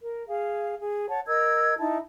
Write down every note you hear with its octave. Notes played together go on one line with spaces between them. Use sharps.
A#4
G#4 F5
G#4
C#5 F#5 A5
A#4 D#5 E6 G#6
D#4 E4 A5